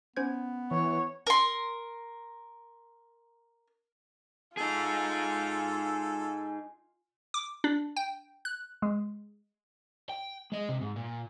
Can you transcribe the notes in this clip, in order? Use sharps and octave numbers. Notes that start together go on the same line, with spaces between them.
B3 C#4 C5 G#6
E3 C#5
A#4 C6
D#4 F4 G#4 A4 G#5
D6
D4
G5
F#6
G#3
G5
G#3 D#5
C3
G#2
A#2